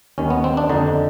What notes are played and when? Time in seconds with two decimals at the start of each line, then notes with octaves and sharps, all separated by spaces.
0.18 D#2 D#3 C#4
0.30 B3
0.44 C4
0.57 D4
0.69 F2 D3 D#4